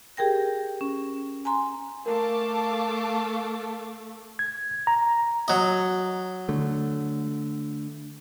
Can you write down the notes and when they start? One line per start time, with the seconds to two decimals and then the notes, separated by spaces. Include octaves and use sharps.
0.17 G4 G#4 A#4 G5 A#6
0.81 C#4
1.45 G#5 A#5 C6
2.06 A3 A#4 F5 A5 D6
4.39 G#6
4.87 A#5
5.48 F#3 D#5
6.49 D3 A3